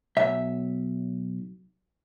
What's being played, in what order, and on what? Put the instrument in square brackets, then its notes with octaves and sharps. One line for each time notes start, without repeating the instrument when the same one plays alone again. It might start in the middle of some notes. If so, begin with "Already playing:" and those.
[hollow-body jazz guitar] B1 E5